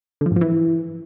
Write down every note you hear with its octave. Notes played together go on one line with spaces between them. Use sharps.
D3
F3
G#2
F3
E3